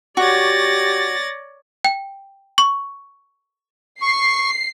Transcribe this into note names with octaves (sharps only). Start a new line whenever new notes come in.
F#4 G4 C#5 D5 A6 A#6
G5
C#6
C#6 C7